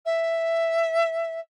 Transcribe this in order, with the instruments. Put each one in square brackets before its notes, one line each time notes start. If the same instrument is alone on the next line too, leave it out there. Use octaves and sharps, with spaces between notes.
[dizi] E5